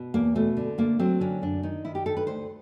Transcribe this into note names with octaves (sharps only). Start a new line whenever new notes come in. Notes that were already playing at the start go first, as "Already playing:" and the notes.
Already playing: B2
E2 A#3
B2 A3
D3
D2 A#3
F#3 C4
D3 C#4
F#2 D4
D#3 D#4
D#3 E4
G4
D#3 A4
B4
D2 C5